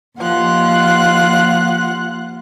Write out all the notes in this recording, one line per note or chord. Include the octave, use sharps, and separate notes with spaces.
D#2 F3 F4 F#5 F#6